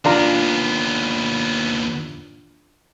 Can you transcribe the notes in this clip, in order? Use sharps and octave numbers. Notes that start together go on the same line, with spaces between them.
D#2 B3 D4 F4 A#5